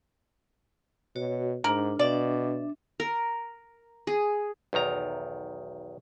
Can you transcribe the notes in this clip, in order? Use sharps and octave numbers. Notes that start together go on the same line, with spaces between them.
B2 F#4 C#5
G#2 D4 A#4
B2 D4 D5 E5
A#4
G#4
B1 E2 D#3 A#5